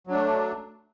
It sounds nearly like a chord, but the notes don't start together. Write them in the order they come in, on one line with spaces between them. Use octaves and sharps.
F#3 D4 A3